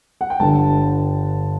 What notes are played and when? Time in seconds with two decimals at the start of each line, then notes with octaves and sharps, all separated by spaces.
0.21 F#5
0.30 G5
0.40 G1 G2 D3 A5